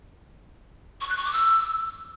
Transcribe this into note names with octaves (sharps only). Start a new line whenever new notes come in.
C#6
F#6
C#6
D6
E6